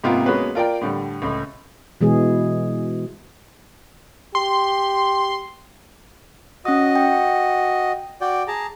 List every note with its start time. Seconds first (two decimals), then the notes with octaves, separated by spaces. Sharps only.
0.04 G#2 C3 A#3 B3 F4 G4
0.26 G#3 A#3 B3 C#4 F#4 B4
0.55 F4 A#4 D5 G5
0.81 A2 D3 G3
1.22 C#2 A2
2.01 B2 E3 G#3 G#4
4.35 G4 C6
6.65 C#4 F#4 D#5 D#6
6.96 G5
8.21 F#4 D5 G5
8.48 G#4 A5 A#5